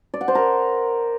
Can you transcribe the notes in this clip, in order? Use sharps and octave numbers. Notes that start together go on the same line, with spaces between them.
D5
F#5
C5
A#4